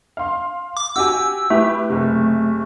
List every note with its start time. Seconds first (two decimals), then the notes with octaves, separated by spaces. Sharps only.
0.17 F5 C6
0.77 D6
0.96 F#4 G4 G#5 E6
1.50 A3 E4 G4 B4
1.89 F#1 C3